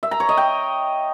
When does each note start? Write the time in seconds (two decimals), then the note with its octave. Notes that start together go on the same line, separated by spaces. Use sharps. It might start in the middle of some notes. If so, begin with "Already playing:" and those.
0.03 E5
0.11 A#5
0.20 C#5
0.29 D#5
0.37 G5